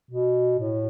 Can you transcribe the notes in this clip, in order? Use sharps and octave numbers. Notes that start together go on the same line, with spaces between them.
B2
A2